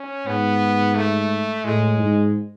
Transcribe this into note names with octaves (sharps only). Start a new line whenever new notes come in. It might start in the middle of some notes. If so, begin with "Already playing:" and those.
Already playing: C#4
G#2 B3
A3
A2 G#3
G#2